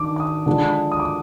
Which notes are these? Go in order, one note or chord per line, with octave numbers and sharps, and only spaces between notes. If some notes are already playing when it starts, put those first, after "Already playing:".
Already playing: D#3 D4 D6
D6
D#6
D3 F3 G#3 D4
D#6
D6